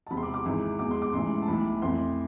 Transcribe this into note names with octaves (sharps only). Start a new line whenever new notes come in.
A5
E1 E2 C3 B5
C6
D6
D6
G#1 G#2 E3
E2 B2 G#3 D6
C6
D6
A1 G#2 E3 G#3 C6
A5
B1 A2 E3 B5
F2 E3 A3 C6